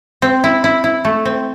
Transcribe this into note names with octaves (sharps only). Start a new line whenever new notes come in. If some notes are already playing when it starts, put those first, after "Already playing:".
C4
E4
E4
E4
A3
C4